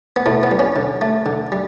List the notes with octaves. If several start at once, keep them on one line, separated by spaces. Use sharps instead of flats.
B3
A2 A3
B3
G3
C#4
D3
A3
D3
G3